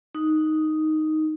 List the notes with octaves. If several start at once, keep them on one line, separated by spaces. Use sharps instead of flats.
D#4